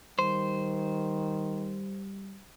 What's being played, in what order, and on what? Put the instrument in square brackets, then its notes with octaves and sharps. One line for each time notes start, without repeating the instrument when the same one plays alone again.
[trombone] D#3 [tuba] G3 [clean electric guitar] C5